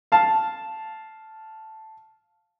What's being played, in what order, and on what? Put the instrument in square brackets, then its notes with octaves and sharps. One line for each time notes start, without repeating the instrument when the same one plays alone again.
[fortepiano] F5 A5